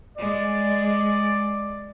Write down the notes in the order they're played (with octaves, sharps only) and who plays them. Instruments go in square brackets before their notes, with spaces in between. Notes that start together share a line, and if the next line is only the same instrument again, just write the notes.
[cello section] G#3 [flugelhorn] D5